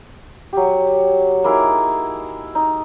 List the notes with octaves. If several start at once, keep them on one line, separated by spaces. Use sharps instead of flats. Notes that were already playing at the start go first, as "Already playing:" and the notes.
F#3 G4
A#3 D#4 E4 G#4
D#4